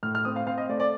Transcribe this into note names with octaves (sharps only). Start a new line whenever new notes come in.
A2 F6
F6
C4 D#6
F5
C4 F5
D#5
A3 D5
D5